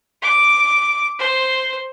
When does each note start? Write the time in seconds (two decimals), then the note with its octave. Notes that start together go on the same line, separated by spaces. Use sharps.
0.22 D6
1.19 C5